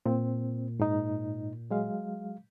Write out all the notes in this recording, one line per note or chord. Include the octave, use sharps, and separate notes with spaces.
A#2 C4
G#2 D#4
F#3 G#3 F5